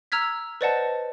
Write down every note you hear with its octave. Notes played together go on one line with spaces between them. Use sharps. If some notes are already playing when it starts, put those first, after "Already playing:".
A#5 E6 F6 G#6 B6
B4 C5 D5 D#5 F#5 A5